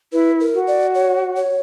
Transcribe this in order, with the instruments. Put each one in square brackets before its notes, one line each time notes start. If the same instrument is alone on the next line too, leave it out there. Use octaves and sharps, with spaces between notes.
[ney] E4 [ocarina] B4
[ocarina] A#4
[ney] F#4
[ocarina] D5
C#5
C#5